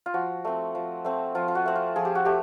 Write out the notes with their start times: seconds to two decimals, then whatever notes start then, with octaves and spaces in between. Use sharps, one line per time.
0.06 F4
0.14 F3 F#4
0.45 A3 C4
0.75 F3
1.05 A3 C4
1.35 F3 F4
1.48 F4
1.55 F#4
1.66 A3 C4
1.75 F4
1.96 F3 G#4
2.05 G4
2.15 F#4
2.25 A3 G4